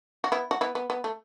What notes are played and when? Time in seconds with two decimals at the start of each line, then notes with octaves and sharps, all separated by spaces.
0.24 F#4
0.32 B3 E4
0.51 F#4
0.61 B3 E4
0.75 B3
0.90 B3
1.04 A3